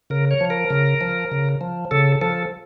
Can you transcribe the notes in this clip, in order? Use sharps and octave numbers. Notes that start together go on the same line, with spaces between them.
C#3 A#4
C#5
F3
A#4
C#3
F3
C#3
F3
C#3 A4
F3 A4